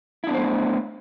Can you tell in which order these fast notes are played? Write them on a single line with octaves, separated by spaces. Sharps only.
E4 D4 B3 C5 A3